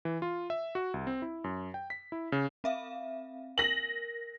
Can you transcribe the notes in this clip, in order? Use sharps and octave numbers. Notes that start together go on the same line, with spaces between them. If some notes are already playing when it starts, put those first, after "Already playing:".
E3
F4
E5
F#4
C2
C4
E4
F#2
G5
B6
E4
C#3
C4 E5 F5
A#4 A#6 F#7